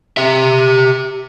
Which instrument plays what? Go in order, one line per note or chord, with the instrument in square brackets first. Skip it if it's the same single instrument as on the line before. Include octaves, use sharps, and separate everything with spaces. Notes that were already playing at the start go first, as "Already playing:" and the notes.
[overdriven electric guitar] G4 E5